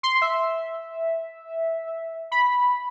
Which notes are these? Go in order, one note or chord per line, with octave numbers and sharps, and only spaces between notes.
C6
E5
B5